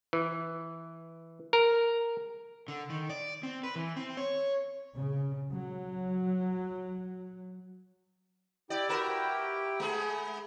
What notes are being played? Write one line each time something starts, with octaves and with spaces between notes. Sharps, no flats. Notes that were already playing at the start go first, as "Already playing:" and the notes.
E3
A#4
D3
D#3
D5
C4
B4
E3
C4
C#5
C#3
F#3
E4 G4 D5 G5
F#4 A#4 B4
G#3 B3 G#4